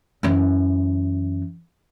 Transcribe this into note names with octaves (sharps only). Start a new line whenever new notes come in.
F#2 E3